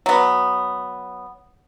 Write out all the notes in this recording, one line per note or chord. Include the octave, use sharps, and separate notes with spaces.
F#3 B3